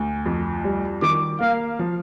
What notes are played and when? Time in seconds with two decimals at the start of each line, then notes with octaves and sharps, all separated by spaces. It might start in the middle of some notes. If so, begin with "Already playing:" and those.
Already playing: D2
0.26 F2
0.64 G3
1.02 D#3 D6
1.41 A#3 F5
1.79 F3